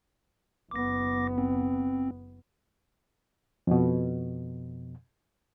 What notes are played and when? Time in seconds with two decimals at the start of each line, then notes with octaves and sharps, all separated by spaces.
0.71 F#1 B3 D6 A#6
1.38 C4
3.67 F2 B2